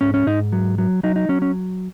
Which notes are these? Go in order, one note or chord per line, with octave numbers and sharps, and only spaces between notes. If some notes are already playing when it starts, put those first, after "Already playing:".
G#2 C#4
C#4
G#2 D#4
F#3
F#3
F#3 D#4
D#4
F#3 C#4
C#4